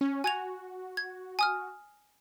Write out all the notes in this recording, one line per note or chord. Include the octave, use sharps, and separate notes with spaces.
C#4
F#4 G#5 G#6 F7
G#6
G#5 D#6 F6